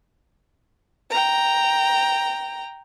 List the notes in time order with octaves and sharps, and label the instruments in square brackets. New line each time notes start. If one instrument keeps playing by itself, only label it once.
[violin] G5 A#5